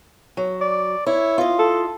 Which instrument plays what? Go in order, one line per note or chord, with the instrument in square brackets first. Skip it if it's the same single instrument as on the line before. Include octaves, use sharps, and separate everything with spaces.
[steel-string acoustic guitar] F#3
[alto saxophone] D5
[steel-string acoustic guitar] E4 [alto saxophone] C#5
[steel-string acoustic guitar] F4 D#5
[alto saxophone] A4